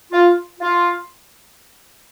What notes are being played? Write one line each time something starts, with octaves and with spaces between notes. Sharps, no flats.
F4
F4